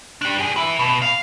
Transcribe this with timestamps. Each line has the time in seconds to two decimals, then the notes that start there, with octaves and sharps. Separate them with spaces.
0.22 D4 G4
0.38 G4 G#4
0.56 B4 E5
0.79 B2
1.02 F5